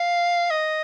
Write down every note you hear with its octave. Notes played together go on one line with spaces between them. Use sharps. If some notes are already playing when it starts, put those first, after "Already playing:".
Already playing: F5
D#5